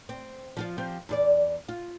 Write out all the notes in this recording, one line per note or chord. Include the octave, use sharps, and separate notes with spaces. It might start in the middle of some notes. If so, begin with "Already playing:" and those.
C4
F3 F4 F5
F3 C4 G4
E2 F4 D5
F4